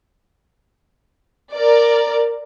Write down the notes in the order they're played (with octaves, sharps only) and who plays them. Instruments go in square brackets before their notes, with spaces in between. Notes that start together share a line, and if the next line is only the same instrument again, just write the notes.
[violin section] A#4 D5